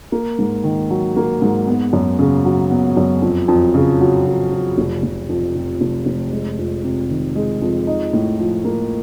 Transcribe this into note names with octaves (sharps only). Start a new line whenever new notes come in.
A#3
G#2
D#3
F#3
A#3
G#2
B3
F#2
C#3
F#3
B3
F#2
F2
F2
C#3
F#3
F2
F2
F1
F1
F2
C3
F1
F1
G#3
F2
C3
D#3
G#3
F2
D#4
A2
F3
A#3